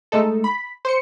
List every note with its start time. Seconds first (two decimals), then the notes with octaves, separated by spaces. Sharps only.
0.12 G#3 A3 D#4 A4
0.44 B5
0.85 C5 C#7